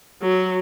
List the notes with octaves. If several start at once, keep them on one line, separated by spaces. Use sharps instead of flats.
F#3